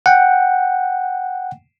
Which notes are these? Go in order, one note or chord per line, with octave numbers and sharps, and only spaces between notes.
F#5 G5